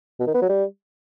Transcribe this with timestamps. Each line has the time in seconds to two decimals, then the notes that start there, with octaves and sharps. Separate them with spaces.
0.20 B2
0.27 D#3
0.34 B3
0.42 F#3
0.49 G3